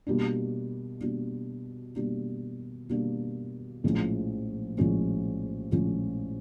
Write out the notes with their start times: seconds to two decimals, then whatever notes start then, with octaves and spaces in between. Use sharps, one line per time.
0.07 B2 G3 A#3 D4
1.01 B2 G3 A#3 D4
1.96 B2 G3 A#3 D4
2.89 B2 G3 A#3 D4
3.84 A#1 A2 F3 G#3 C#4
4.78 A#1 A2 F3 G#3 C#4
5.72 A#1 A2 F3 G#3 C#4